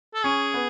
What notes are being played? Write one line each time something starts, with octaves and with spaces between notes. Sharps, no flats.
A4
C#4 G#4
B3